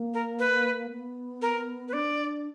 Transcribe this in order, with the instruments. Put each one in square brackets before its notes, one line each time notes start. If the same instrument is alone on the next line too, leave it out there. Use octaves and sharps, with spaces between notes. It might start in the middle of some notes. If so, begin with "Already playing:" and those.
Already playing: [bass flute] A#3
[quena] A#4
B4
[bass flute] B3
[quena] A#4
B4
[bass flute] D4 [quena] D5